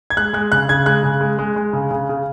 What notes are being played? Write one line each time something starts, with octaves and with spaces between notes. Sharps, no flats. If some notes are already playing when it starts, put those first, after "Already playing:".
G#6
G#3 F#6
G#3 F#6
C#3 F#6
C#3 G#6
G#3 F#6
C#3
G#3
G#3
G#3
C#3
C#3
C#3